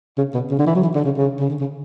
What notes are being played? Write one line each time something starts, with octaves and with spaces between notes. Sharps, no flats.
C#3
B2
C#3
D3
E3
F#3
E3
D3
C#3
C#3
C#3
D3
C#3